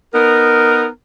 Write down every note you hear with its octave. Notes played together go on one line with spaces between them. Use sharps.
B3 D#4 A#4